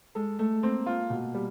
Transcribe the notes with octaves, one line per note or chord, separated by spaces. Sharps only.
G#3 A4
A3 A4
A#3 C4
F4
B2
G3